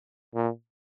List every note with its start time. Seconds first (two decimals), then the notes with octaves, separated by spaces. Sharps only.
0.35 A#2